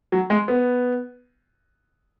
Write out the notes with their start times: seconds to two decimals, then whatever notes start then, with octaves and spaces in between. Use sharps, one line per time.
0.12 F#3
0.30 G#3
0.48 B3